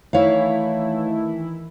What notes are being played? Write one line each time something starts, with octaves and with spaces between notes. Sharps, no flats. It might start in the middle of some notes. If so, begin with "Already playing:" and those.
D#3 E3 A3 E4 C#5 F5